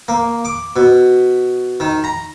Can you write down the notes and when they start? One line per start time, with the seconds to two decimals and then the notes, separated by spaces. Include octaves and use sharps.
0.08 A#3
0.45 D6
0.76 B2
1.80 D#3
2.04 A#5